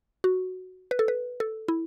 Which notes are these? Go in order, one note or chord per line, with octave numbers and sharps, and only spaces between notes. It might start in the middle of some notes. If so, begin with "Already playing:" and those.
F#4
B4
A4
B4
A4
E4